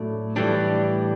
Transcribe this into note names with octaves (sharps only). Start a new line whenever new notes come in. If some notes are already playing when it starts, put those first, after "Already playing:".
Already playing: A2 F#3 A3 D4
A2 E3 G3 D4